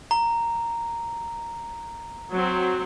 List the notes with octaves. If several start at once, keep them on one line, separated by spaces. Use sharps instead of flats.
A#5
F#3 C4